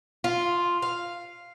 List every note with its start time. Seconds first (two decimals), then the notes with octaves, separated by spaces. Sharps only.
0.24 F4
0.82 F5